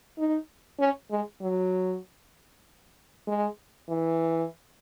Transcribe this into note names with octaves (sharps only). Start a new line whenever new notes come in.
D#4
C#4
G#3
F#3
G#3
E3